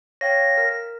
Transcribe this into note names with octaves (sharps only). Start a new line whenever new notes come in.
C#5 F5 G5 A#6
A#4